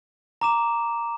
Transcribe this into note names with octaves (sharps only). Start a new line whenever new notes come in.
A#5 D6 E7